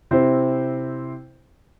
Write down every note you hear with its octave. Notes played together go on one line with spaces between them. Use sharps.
C3 C4 E4 C5